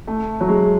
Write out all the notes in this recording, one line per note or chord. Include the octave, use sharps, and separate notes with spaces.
A3
F#3
G#3